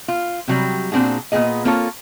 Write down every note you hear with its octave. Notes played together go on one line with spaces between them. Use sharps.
F4
C3 F#3 G3
A#2 C4 D4 F#4 G#4
A#2 G3 B3 G#4 D#5
A#3 C4 F4 A4 C#5